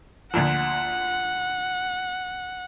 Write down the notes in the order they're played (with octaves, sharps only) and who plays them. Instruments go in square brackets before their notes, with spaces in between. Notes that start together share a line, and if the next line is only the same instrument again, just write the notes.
[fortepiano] D2 A#2 F3 [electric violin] F#5